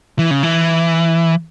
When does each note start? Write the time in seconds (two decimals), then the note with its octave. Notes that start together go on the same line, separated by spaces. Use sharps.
0.19 E3
0.31 C#3
0.43 E3